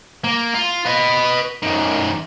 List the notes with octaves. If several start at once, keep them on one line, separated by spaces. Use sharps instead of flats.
A#3
F4
B4 D#5
F#2 D#3